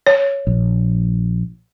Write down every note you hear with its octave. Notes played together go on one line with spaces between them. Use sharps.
C#5
A#1